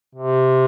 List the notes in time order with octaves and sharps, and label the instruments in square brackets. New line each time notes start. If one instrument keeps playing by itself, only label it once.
[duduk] C3